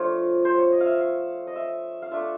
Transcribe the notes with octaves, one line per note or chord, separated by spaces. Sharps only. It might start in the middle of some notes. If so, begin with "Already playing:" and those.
Already playing: F3 A3 D4 F4 C#5
C5
C#5
D#5
E5 F5
F5
D#5
E5
F5
A3 D4 F4 E5